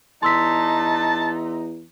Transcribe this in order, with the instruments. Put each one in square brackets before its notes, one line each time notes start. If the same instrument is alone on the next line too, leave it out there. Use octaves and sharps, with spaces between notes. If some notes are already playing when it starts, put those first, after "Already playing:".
[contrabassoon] E2 [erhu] D#4 [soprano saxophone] A5 [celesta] C6 E6 B6